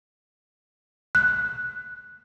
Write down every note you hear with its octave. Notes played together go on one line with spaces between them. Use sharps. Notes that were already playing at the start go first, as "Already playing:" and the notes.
F#6